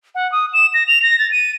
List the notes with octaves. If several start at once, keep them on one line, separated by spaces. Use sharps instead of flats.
F#5
D#6
E7
A#6
F7
A#6
A6
D#7